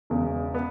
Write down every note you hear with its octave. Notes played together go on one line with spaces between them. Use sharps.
E1 E2 C#3
B3